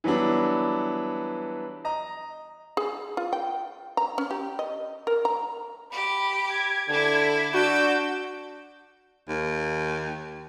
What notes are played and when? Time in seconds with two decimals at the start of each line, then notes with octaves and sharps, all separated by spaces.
0.04 E3 F#3 G3 B3 D4
1.85 D#5 A#5
2.77 G#4
3.17 F4
3.33 G5
3.97 A#5
4.18 C#4
4.31 G4
4.59 D#5
5.07 A#4
5.25 A#5
5.92 G4 B5
6.51 G#6
6.89 D3 D4 E4 G#6
7.54 D4 F#4 D6 E6 G6
9.29 D#2